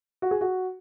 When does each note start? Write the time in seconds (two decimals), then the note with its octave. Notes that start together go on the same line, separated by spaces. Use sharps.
0.22 F#4
0.31 G#4
0.41 F#4